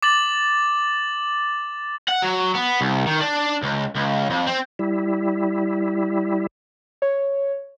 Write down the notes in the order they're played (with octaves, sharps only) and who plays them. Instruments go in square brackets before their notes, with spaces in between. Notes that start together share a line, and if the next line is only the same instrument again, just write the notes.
[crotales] D6 A6 F#7
[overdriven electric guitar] F#5
F#3
B3
C2
D#3
D4
C#2
C#2
F2
C4
[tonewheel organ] G3 E4
[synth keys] C#5